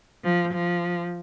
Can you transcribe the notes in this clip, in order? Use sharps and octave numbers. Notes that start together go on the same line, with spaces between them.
F3
F3